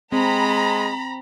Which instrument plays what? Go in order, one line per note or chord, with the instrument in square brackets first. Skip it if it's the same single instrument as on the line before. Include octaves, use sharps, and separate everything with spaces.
[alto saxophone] G#3 [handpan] C4 [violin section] A#5 B5